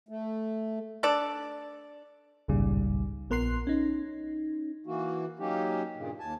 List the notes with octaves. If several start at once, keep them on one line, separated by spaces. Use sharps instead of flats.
A3
D4 A4 D5
G#1 C#2 G2 A#2 C#3 G3
A#1 B3 A#4 C6 F#6 C7
C#4 D#4
E3 A#3 F#4
F#3 A#3 C#4 D#4 G4
G2 A#2 C#3
D#2 G#5 A5